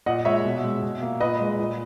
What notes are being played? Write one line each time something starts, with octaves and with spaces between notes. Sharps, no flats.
A#2 D#5 F#5
G#3 C#5 E5
B2
G#3
B2
A#3
A#2 B4 D#5
G#3
A#2